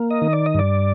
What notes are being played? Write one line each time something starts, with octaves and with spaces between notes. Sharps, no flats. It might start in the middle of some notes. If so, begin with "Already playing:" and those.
Already playing: A#3
D#5
D#3
D5
D#5
G2 D5